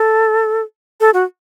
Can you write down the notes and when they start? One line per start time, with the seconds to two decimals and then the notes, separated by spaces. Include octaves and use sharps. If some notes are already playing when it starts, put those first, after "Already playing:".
Already playing: A4
1.00 A4
1.14 F#4